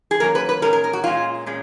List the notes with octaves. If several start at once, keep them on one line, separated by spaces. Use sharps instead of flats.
G#4
B2 F#3 A#3 C#4 A#4
B4
B4
A#2 G#3 C#4 A#4
A#4
A#4
F#4
A#2 G#3 C#4 F4
A#2 G#3 C#4